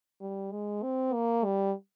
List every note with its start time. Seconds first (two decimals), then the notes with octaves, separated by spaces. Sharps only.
0.21 G3
0.52 G#3
0.83 C4
1.14 A#3
1.45 G3